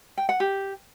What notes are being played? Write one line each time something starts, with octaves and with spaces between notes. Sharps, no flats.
G5
F#5
G4